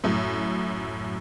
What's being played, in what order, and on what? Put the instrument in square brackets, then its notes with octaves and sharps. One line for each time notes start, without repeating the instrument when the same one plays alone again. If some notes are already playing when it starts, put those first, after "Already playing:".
[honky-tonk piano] F#2 A2